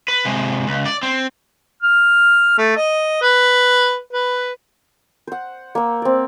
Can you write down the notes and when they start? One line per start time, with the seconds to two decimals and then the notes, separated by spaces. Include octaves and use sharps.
0.08 B4
0.25 C3 G#3
0.67 C#2
0.86 D5
1.03 C4
1.83 F6
2.58 A3
2.77 D#5
3.22 B4
4.13 B4
5.27 C5 F#5
5.75 A#3 E6
6.02 C4 D5